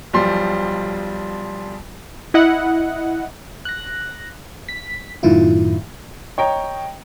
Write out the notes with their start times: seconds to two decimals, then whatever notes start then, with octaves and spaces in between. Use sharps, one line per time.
0.13 B1 F3 G3 C6
2.34 E4 D#5 F#5
3.65 F#6 A#6
4.69 B6
5.23 F#2 A2 D#3 E4 F4
6.38 C#5 D#5 G5 A#5